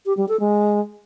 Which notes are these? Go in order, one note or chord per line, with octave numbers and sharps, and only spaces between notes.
G4
G3
A4
G#3